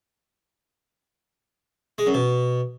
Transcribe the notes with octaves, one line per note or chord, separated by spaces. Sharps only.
G#3
F#2
B2